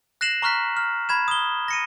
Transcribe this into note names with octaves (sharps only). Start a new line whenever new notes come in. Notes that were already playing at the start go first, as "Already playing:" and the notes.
F#6 A#6 C7 E7 F#7
A#5 C#6 F6 F#6 B6
F6
B5 G#6 E7
D#6 G7
A#6 C#7 D#7